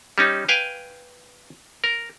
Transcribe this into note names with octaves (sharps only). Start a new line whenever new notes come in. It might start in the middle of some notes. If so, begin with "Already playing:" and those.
G3 C#4 D#4
B4 F5 G5 G#5
A#4